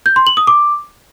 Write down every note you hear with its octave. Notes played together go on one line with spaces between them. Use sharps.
G6
C6
F#7
D#6
D6